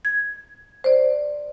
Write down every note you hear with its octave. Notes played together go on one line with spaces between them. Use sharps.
G#6
C5 D5